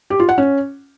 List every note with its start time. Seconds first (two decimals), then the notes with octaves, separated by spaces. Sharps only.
0.10 G4
0.20 F4
0.29 F#5
0.38 C#4